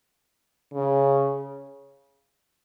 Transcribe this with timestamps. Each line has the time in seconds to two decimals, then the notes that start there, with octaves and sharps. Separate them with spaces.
0.74 C#3